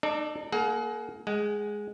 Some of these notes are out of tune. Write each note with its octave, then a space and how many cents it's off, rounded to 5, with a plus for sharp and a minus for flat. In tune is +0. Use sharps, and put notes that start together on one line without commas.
D#4 -35 A4 +5 D5 +0
A#3 +0 G#4 +40 F#5 +20
G#3 +0 F#5 +40